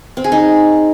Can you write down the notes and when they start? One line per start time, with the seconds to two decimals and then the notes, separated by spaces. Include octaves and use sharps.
0.17 C4
0.24 G#4
0.32 D#4